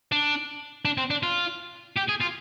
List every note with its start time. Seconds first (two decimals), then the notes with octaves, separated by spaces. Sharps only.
0.12 D4
0.85 D4
0.98 C4
1.10 D4
1.23 F4
1.96 G4
2.08 G#4
2.20 F4